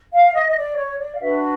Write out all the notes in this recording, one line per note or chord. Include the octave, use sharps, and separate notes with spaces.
F5
D#5
D#5
D5
C#5
D5
F5
D4 F#4 B4 E5